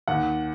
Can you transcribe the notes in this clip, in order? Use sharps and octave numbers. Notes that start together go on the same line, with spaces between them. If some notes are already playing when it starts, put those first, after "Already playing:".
D#2 F#5